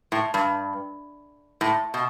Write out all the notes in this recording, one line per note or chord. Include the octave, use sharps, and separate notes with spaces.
A2
G2
A2
B2